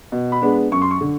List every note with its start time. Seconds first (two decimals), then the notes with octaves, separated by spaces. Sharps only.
0.12 B2
0.32 B5
0.42 G#3 B3 D4
0.72 F#2 C#6
0.82 C6
0.91 C#6
1.01 D3